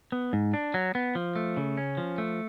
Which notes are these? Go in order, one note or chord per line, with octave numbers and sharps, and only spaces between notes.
B3
G#2
D4
F#3
B3
F3
A3
C#3
C#4
F3
A3